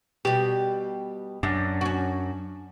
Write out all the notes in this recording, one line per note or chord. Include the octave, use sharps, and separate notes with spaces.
B2 G3 G4
F#2 D4
C#4 F#4